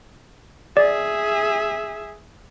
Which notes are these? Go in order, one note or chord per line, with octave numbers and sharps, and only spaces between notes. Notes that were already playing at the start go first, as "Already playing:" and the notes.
G#4 D5 E5